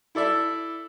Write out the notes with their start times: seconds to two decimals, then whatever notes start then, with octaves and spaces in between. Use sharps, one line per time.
0.15 E4 A4 D5 E5